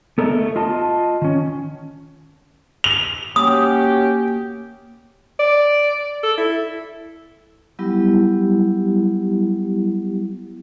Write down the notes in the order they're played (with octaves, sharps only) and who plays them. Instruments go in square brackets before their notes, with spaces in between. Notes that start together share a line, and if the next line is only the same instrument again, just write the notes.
[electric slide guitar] B3 A4 A#4 C#5 D#5 E5
A3
F4 D#5 A5
D#3 C#4
[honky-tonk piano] F7
[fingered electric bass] A#3 [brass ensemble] C#4 F#4 G4 [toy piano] D#6
[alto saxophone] D5
A4
E4
[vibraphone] F#3 G3 B3 E4 G4